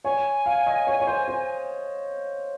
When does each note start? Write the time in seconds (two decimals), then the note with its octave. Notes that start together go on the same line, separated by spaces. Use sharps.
0.04 C#5 G#5
0.46 F5
0.67 D#5
0.87 C#5
1.00 C#5
1.07 C5
1.28 C5